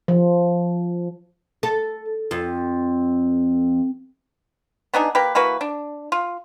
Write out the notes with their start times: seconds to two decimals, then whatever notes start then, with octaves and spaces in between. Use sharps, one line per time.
0.08 F3
1.63 A4
2.31 F2
4.93 B3 D4 D#4 G#4
5.15 A#3 G4 B4
5.35 E3 A#3 F#4 B4
5.61 D4
6.12 F4